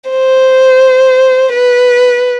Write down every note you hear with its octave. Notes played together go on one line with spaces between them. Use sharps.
C5
B4